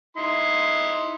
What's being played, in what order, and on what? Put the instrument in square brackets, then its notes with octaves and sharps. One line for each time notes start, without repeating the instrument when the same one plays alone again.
[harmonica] D#4 E4 C6